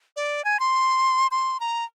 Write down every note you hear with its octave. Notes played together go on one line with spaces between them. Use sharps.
D5
G#5
C6
C6
A#5